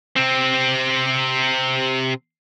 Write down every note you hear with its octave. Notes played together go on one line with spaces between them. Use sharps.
C3 C4